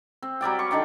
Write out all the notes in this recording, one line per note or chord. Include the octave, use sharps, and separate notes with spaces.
C4
F#3 G3 D5 G5
C#6
D3 D#3 D5 G5